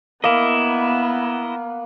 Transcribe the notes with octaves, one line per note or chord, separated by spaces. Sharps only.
A#3 B3 E4 D#5